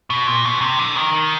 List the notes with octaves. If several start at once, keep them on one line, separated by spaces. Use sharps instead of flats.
B2
A#2
B2
C3
D3
D#3